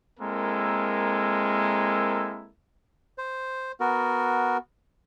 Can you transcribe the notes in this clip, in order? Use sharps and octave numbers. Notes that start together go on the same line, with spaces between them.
G#3 A#3 C4 E4 A4 A#4
C5
B3 F#4 A#4